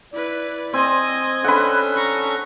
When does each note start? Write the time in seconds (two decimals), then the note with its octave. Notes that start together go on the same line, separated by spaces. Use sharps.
0.13 E4 B4 D5
0.74 C4 D#5 G#5
1.44 C#4 D4 A4 B4 F#5
1.96 A#5 C#6